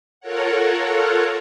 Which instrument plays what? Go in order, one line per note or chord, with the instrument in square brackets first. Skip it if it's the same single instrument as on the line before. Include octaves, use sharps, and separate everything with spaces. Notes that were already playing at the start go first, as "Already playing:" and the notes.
[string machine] F4 A4 A#4 C#5 F#5